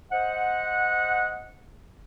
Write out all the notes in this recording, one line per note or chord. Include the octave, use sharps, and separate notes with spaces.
C5 D#5 F#5